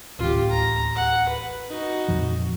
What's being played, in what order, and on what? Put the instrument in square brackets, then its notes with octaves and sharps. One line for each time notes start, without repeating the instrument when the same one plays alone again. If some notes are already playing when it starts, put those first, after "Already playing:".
[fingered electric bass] D1 A1 D#2 [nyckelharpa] F4 G4
[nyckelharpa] A#5
F#5
B4
D#4 F#4
[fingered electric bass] F2 A#2 F3